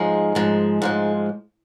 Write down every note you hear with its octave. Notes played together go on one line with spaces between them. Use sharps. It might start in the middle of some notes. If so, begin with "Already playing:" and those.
Already playing: G#2 F3 G#3 D#4 G#4
G#2 F3 G#3
G#2 F3 G#3